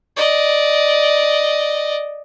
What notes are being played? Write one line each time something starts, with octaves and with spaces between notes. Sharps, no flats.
D5 D#5